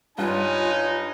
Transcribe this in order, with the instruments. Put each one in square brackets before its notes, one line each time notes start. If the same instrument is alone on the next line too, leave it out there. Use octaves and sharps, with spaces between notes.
[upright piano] G2 [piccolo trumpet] D#4 [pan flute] F4 [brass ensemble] C#5 G#5